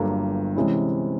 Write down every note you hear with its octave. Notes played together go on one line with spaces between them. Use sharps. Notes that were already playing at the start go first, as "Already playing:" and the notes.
Already playing: G1 G2 D3 F#3 A#3
C3 E3 G#3 C#4 E4